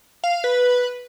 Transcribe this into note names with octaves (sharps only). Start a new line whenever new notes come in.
F5
F5
B4